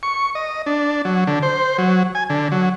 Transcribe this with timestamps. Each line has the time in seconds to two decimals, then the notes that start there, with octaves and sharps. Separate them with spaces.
0.03 C#6
0.35 D#5
0.66 D4
1.05 F#3
1.27 D3
1.43 C5
1.78 F#3
2.15 G#5
2.30 D3
2.52 F#3